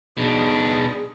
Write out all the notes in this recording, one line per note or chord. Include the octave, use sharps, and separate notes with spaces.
B1 B2 D4 G#4